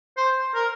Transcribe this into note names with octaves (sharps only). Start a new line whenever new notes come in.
C5
A#4